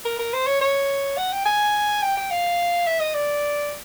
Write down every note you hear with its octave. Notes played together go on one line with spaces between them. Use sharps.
A#4
A#4
C5
C#5
C#5
F#5
G5
G#5
G5
G5
F5
E5
D#5
D5